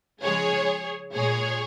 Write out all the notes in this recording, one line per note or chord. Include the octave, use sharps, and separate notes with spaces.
C#3 F3 G#3 G#4 C#5
A#2 G#3 G#4 C#5